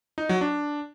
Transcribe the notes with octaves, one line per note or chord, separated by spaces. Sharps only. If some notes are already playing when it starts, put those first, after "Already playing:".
D#4
F#3
D4